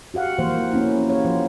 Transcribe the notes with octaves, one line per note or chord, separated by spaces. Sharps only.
F#4 G4 F5 F#5
E3 F3 A#3 C5
A#3 B3 C#4 E4
G4 C#5
F3 C5